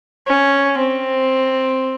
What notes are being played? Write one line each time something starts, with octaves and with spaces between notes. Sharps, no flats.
C#4
C4